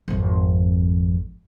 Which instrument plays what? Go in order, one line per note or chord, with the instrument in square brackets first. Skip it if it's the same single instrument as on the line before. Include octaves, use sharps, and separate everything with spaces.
[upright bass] G#1 F2